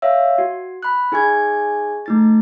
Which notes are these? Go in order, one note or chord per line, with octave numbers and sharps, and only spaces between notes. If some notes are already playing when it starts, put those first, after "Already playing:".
C#5 E5 F5 E6
F#4
B5 F#6
D#4 G#4 G#5 C#6 G#6
A3 D#4 A6